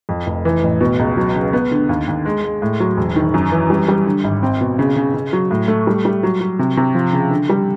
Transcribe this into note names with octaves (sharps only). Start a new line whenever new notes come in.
F2
F1
E3
A1
B2
C#2
F#3
C#3
B3
D3
D#2
D#2
G#3
G#3
A2
F#3
E1
D#3
F#2
E3
G3
G3
D3
G#1
C4
B2
C#3
C#3
C#3
F#3
A2
A3
G3
G3
F#3
F#3
C3
C3
F3
C#3
D3
G3